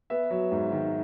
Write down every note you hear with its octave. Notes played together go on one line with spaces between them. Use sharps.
B3 E5
F#3
G#2
D#3